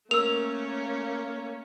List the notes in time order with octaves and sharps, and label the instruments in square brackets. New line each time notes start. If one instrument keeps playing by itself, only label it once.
[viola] A3 C#4 [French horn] A#3 [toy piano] A#4 E6 [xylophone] F7